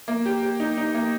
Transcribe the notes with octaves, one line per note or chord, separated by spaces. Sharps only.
A#3
G4
G4
D#4
D#4
A#3